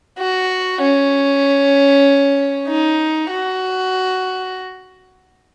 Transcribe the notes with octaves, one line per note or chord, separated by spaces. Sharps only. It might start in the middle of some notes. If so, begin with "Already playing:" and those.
F#4
C#4
D#4
F#4